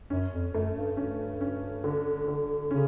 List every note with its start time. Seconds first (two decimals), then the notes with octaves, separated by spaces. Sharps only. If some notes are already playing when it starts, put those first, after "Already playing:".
0.10 F#2 C#4
0.32 F2
0.54 F#2 A3
0.76 G2
0.97 G2 C#4
1.41 C#4
1.84 D3
2.28 D3
2.71 C#3 C#4